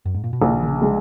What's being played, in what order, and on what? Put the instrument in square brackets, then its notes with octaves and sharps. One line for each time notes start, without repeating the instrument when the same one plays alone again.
[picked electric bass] F#2
G#2
A#2
B2
[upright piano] A#1 [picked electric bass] C#3
[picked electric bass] D#3
C#3
[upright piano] G#3